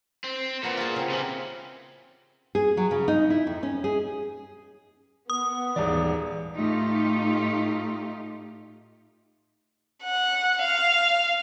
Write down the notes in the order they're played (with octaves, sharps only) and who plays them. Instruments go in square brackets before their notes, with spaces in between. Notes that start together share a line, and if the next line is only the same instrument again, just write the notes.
[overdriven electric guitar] C4
[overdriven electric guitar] A#2 [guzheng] B3 F#4 A#4
[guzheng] F4 G#4
C#3 C4
[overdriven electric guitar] C3 E3
[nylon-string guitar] G#4
F#3
C#3
D#4
E4
F2
C#4
G#4
[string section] B3 [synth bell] D#6
[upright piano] D#1 G#2 D5 [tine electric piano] E3
[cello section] A2 A3 D#4 F4 G4
[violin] F#5
F5